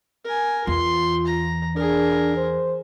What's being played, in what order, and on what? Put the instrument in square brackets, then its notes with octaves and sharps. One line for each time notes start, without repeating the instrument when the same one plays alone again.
[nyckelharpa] A#4 G#5
[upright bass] E2 [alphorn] F4 [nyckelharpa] C6
[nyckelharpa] A#5
[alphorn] D4 [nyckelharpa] G#4 A#4
[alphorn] C5